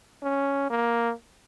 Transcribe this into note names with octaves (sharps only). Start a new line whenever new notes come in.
C#4
A#3